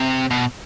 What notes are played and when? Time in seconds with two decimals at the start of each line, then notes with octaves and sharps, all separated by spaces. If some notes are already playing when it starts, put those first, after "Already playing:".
Already playing: C3
0.31 B2